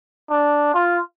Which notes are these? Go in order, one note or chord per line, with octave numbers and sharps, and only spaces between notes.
D4
F4